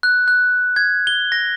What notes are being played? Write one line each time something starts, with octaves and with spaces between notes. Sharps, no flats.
F#6
F#6
G#6
G7
A#6